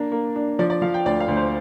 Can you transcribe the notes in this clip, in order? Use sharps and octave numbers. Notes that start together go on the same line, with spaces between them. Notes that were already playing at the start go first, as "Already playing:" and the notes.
Already playing: A#3 D4
A#3
D4
F3 D5
D5
F3 F5
G5
D2 D5
F5
D2
C5